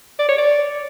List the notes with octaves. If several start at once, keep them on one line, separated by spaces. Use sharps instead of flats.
D5
C#5
D5